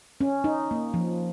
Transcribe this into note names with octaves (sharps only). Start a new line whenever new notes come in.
C#4
D#4
A#3
F3